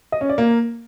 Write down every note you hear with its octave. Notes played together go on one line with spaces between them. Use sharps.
D#5
C#4
D5
A#3